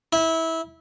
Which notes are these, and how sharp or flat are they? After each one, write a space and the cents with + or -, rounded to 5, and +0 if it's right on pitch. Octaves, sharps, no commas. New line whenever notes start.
E4 -20